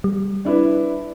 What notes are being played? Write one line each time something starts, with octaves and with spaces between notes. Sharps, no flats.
G3
D4 E4 B4